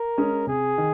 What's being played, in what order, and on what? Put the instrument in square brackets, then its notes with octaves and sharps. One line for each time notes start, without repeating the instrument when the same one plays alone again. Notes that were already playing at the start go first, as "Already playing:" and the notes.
Already playing: [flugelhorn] A#4
[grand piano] G#3 C#4 G#4
[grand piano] C3 [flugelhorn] G#4
[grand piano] D#3